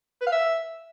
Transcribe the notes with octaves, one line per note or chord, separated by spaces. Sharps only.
B4
F5
E5